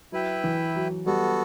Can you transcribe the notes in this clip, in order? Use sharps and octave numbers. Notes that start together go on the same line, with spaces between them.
F#3 E4 B4 E5 G5
E3
F#3
G3 B3 F#4 A4